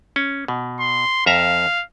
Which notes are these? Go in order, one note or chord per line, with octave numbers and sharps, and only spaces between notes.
C#4
B2
C6
F2 E5 F5 A#5